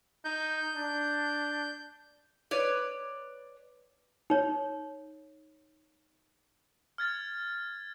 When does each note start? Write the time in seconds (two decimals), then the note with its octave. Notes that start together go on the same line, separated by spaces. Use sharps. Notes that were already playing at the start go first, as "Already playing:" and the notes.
0.25 D#4 G6
0.75 D4
2.51 B4 C#5 D5
4.30 D#4 C#5
6.98 F6 G#6 A6